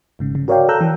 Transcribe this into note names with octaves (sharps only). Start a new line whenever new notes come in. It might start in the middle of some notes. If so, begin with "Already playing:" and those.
G1 G#2 C#3
C#3
F#4 A#4 C#5 D5 F5 G5
A4 G5 A#5 E6 F#6 G6
E3